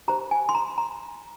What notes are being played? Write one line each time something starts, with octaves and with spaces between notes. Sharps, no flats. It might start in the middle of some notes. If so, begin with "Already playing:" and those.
G4 C5 A#5
G#5
C6
A#5
A#5